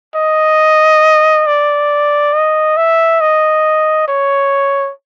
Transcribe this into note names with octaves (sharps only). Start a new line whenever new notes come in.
D#5
D5
D#5
E5
D#5
C#5